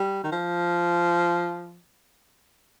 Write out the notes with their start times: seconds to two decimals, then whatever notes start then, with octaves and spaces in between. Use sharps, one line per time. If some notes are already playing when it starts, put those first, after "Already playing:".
Already playing: G3
0.24 D#3
0.32 F3